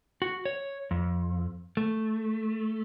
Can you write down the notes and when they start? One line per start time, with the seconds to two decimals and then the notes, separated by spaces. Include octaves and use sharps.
0.22 F#4
0.45 C#5
0.91 F2
1.77 A3